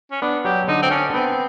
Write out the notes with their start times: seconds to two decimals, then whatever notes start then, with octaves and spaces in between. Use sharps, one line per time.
0.12 C#4
0.22 B3 D4
0.45 F#3 G4
0.68 D3 D#4
0.82 C4
0.91 C#4 D4
1.14 B3 C4